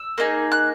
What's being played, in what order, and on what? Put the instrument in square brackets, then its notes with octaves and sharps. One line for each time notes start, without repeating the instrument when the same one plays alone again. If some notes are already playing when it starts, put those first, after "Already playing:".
Already playing: [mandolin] E6
A#3 D#4 G#4
F#6